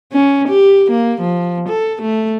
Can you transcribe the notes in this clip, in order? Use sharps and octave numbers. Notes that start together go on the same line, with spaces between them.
C#4
G4
A#3
F3
A4
A3